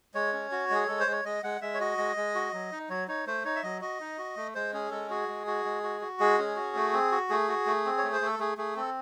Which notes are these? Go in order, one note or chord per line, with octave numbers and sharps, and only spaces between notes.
G#3 C#5
C#4
F#4
G#3 G#4
G#3 A4
C5
G#3
C#5
G#3 D#5
G#3 F#5
G#3 E5
C#5
F#4 D#5
G#3
G#3
F#4
F#3
D#4
F#3 C#5
D#4 C#5
A3 C5
D#4 C#5
E5
F#3 D#5
F#4 D#5
D#4
F#4
A3
G#3 C5
C#4 G#4
G#3 A4
F#4 G#4
G#3
F#4
G#3
F#4
F#4
G#3 G#4
C#4
F#4
A3
C4
F#4
A3 G#4
F#4
A3
C4
C#5
A3
C5
A3 A4
A3 G#4
A3 G#4
C4 A4